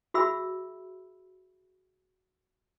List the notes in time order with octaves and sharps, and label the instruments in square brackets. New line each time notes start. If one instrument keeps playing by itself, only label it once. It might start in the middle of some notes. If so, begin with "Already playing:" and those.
[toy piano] F#4 G#4 E5 B5 E6